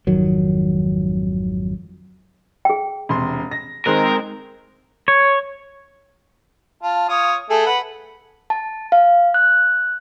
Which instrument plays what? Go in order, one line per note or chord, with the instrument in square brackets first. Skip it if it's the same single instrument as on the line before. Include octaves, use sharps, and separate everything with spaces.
[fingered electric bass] G#1 F2 D#3 F#3
[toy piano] G#4 G5
[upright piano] E1 C3 C6
A#6
[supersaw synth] D#3 G#3 C4 [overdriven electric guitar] A#4 [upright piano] F#6
[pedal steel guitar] C#5
[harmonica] F4 A5
F4 C#5 D#6
A3 G#4 A4
B4 F#5
[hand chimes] A5
F5
F#6